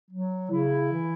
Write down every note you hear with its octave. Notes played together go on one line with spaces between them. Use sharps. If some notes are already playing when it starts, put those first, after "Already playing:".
F#3
C#3 E4
E3